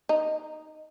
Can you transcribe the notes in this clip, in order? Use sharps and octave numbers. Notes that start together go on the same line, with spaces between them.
D#4